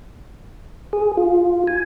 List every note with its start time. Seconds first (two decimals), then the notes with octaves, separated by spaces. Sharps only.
0.93 G#4
1.17 F4
1.67 G#5